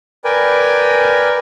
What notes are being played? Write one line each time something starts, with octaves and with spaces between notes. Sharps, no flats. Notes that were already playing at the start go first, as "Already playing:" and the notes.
A#4 B4 D5 G5 G#5